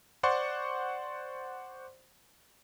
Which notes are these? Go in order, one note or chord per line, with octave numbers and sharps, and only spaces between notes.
C5 D5 F#5 C6 C#6